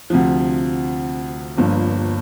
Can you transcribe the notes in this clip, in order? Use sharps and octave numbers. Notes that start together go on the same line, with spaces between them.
D2 C3 F3
G1 G2 F3 A#3